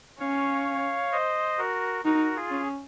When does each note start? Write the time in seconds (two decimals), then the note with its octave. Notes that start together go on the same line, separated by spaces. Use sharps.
0.20 C#4 C#5 F5
1.12 C5 D#5
1.58 F#4 A#4
2.05 D#4 F#4 A#4
2.35 F4 G#4
2.51 C#4